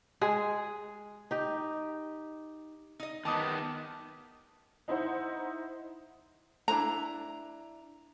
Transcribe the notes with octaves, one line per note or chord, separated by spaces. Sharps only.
G#3 G#4
D#4 G4
D#4 D#5
D#3 B3 A5 D6 D#6
D#4 E4 C5 F#5
D4 E4 B4 A#5